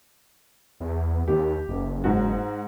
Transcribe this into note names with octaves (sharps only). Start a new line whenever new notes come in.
E2
D#2 G4
F#1
G#2 F#4